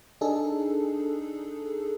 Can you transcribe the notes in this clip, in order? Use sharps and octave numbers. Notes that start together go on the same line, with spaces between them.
D4 D#4 G#4 A4